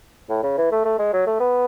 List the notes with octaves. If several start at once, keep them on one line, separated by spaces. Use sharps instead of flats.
A2
C#3
E3
A3
A3
G#3
F#3
A3
B3